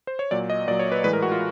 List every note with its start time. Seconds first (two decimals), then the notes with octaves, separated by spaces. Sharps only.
0.07 C5
0.19 C#5
0.31 A#2 F#3 D5
0.50 D#5
0.67 A#2 D5
0.71 F#3
0.79 C#5
0.92 B4
1.04 A2 E3 G#3 B4
1.13 A#4
1.22 F#4
1.32 F4